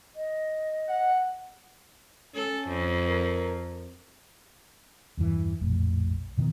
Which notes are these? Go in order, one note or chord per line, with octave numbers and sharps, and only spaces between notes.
D#5
F#5
C#4 A4
F2
A#4
E2 G2 E3
A#1 F2 A2
B2 D#3 E3 B3